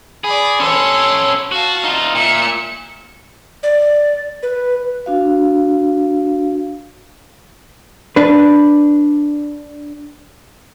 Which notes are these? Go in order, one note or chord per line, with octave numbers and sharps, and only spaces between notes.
G#4 D5 B5
C#4 A4 C#5 C6
F#4 F5 A5
D#4 F4
A#2 E5 C#7
D5
B4
D4 F#4 F5
D4 B4